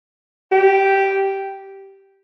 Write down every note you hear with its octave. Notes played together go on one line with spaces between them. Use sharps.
G4